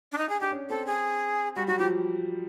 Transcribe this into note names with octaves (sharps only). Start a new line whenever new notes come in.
D4
D#4
G#4
D4 G4
C#4
C4 A4
G#4
G3 F#4
F#3 F#4
F3 G4